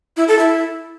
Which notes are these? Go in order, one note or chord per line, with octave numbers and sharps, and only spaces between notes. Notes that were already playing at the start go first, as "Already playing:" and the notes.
E4
A4
E4